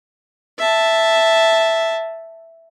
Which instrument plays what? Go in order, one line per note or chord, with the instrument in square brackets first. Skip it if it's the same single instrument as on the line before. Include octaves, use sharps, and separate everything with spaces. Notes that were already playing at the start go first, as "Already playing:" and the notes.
[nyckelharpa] E5 A5